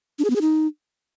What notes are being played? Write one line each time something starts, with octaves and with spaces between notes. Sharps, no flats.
D4
G#4
B3
G#4
D#4